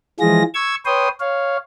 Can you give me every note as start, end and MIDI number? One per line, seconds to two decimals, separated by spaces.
0.20 0.43 52
0.20 0.43 53
0.20 0.43 56
0.20 0.43 65
0.20 0.43 68
0.20 0.43 94
0.54 0.75 85
0.54 0.75 88
0.54 0.75 92
0.85 1.08 71
0.85 1.08 73
0.85 1.08 79
0.85 1.08 84
0.85 1.08 87
1.20 1.57 73
1.20 1.57 77